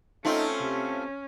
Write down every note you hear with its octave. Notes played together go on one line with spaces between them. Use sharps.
A3 C4 C#4 D#4 F4
C3